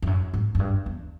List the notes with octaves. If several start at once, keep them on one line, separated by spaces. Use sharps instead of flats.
F2
F#2
G#2
F#2
G2
E2